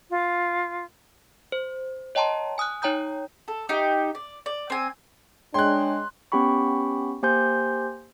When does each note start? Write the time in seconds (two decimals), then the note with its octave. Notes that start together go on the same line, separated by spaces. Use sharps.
0.10 F4
1.52 C5
2.15 C#5 D#5 G5 A5 A#5 C6
2.58 G#5 D#6 F6 F#6
2.82 D#4 C#5 G5 A#5 D#6 G6
3.48 A4
3.69 D#4 G4
4.15 D5
4.46 D5
4.70 C4 G#5
5.54 G#3 D4 C#5 G5 C6 F#6
6.32 B3 C#4 G4 G5 B5 C#6
7.23 A#3 G4 C5 G#5 C6 G6